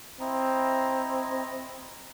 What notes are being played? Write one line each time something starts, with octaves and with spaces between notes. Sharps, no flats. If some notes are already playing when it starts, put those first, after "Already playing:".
C4 E4 D#5 A#5